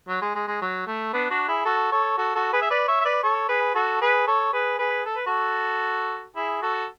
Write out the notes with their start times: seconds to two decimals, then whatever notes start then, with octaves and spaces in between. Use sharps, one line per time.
0.08 F#3
0.22 G#3
0.35 G#3
0.48 G#3
0.62 F#3
0.87 A3
1.13 B3 D4
1.30 D4 F#4
1.48 E4 G#4
1.65 F#4 A4
1.92 A4 C#5
2.18 F#4 A4
2.35 F#4 A4
2.53 G#4 B4
2.62 E5
2.70 B4 D5
2.88 C#5 E5
3.00 E5
3.05 B4 D5
3.23 A4 C#5
3.49 G#4 B4
3.74 F#4 A4
4.01 G#4 B4
4.27 A4 C#5
4.53 G#4 B4
4.79 G#4 B4
5.05 A4
5.16 B4
5.26 F#4 A4
6.36 E4 G#4
6.62 F#4 A4